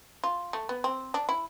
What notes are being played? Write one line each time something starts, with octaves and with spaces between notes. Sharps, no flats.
F4
A3
B3
C4
D4
E4